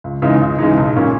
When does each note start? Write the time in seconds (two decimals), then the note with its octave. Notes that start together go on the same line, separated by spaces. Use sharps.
0.04 C#2
0.22 C#3 E3 G#3 D#4
0.41 C#2
0.58 C#3 E3 G#3 D#4
0.77 B1
0.96 A#2 A#3 C#4